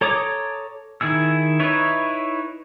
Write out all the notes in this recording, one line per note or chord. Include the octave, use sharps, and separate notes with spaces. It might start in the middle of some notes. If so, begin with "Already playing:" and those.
A4 C#5 A#5 D6 D#6
D#3 E4 G#4 E6
D#4 E4 B4 C#5 E5